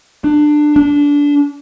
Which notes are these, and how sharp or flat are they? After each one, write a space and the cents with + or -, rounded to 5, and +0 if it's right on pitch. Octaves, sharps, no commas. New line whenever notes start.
D4 +20
D4 -20